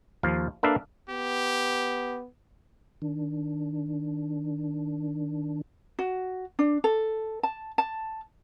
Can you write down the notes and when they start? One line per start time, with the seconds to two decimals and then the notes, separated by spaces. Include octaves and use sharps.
0.23 D#2 F3 F5
0.63 A#3 D4 A4 B4 E5 F5
1.10 B3 G4
3.02 D#3 D4
5.99 F#4
6.59 D4
6.84 A4
7.43 A5
7.78 A5